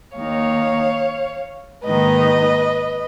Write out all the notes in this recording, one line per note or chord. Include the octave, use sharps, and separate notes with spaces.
D#2 D#3 A#3 D#4 C#5 F5
G#2 D#3 A#3 D#4 B4 D#5